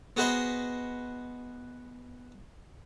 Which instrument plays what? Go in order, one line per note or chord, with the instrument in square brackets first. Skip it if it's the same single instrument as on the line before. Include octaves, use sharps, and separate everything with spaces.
[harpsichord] B3 F#4 G#4 B4 C5 D#5